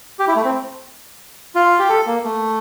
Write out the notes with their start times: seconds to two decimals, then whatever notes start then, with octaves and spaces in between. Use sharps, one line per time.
0.19 G4
0.28 E4
0.36 A3
0.44 C4
1.55 F4
1.79 G4
1.89 A4
2.07 A#3
2.24 A3